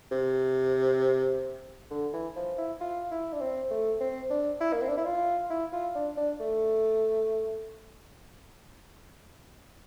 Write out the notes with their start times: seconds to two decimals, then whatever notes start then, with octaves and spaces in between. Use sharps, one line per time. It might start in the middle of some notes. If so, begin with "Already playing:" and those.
0.11 C3
1.90 D3
2.13 E3
2.36 F3
2.58 E4
2.81 F4
3.11 E4
3.33 D4
3.41 C4
3.71 A3
4.01 C4
4.30 D4
4.61 E4
4.73 A#3
4.81 C4
4.89 D4
4.97 E4
5.05 F4
5.50 E4
5.73 F4
5.95 D4
6.17 D4
6.40 A3